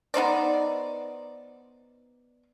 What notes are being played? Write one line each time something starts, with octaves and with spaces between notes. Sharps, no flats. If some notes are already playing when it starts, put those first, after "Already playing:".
B3 D#4 C5 D5